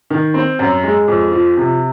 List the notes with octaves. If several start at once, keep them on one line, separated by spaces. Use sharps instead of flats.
D#3
C4
F#2
G#3
F2
F3
C3